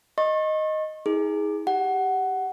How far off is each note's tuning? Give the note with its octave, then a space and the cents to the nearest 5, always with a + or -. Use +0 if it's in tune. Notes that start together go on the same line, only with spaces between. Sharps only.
D#5 +0 C#6 -40
D#4 +45 G#4 +0
G4 +5 F#5 +10